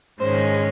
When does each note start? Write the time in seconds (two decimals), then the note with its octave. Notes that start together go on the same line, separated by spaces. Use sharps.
0.20 G#2 D#3 G#3 C#4 C5